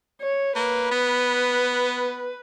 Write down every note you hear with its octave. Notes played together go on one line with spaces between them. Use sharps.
C#5
A#3 B4
B3